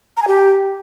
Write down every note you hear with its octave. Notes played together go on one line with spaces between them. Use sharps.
A#5
G#5
G4